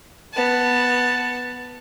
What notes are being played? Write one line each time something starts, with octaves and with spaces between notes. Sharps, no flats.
B3 A5